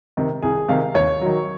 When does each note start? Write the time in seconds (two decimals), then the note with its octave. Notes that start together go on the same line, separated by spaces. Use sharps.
0.17 C3 D#3
0.42 C2 G#4
0.69 C3 D#3 F5
0.95 D#2 C#5
1.21 D#3 F#3